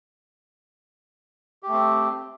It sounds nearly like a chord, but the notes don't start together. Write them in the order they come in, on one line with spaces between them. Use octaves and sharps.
G4 A3 C4